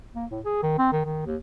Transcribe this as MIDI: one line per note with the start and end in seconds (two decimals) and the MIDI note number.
0.15 0.26 58
0.31 0.40 45
0.45 0.59 68
0.63 0.74 51
0.78 0.90 60
0.92 1.01 51
1.05 1.22 51
1.26 1.36 39